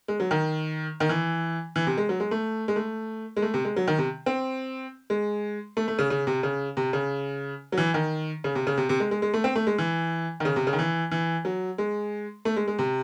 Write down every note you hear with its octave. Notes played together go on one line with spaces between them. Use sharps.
G#3
F#3
D#3
D#3
E3
E3
C3
G#3
F#3
G#3
A3
G#3
A3
G#3
A3
C3
G#3
F#3
D#3
C3
C4
G#3
A3
A3
C#3
C#3
C3
C#3
C3
C#3
F#3
E3
D#3
C#3
C3
C#3
C3
C3
G#3
G#3
G#3
A3
C4
A3
G#3
E3
D#3
C#3
C3
C#3
D#3
E3
E3
F#3
G#3
A3
G#3
G#3
C3